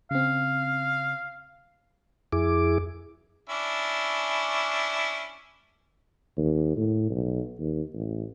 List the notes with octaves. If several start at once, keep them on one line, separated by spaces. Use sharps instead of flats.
C#3 C4 F5
F2 E4 G#4 D6
C#4 D4 E4
D#2
A2
B1
D#2
A1